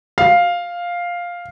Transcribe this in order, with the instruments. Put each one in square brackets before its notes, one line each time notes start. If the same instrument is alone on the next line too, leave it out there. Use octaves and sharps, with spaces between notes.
[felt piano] F5